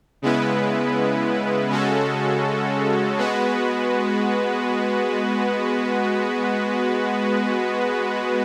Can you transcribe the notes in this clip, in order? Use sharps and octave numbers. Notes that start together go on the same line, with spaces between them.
C#3 G#3 B3 E4 B4
C#3 G#3 C#4 F#4 A4
G#3 B3 F#4 B4